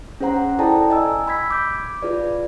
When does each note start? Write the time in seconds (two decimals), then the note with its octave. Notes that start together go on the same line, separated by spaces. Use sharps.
0.20 C#4 G#4 C5 F#5 A#5
0.59 E4 A4 D5 G5 A5 A#5
0.90 D#5 G#5 E6
1.27 B5 E6 G#6 B6
1.51 D6 G6
2.03 F4 G#4 B4 D5